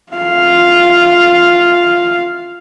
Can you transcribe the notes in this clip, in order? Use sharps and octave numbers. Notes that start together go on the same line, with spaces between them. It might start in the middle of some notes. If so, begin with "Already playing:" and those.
F4 F5